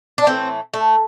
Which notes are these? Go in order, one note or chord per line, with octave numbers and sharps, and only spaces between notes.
D4
A2 E3 A3 C4
A3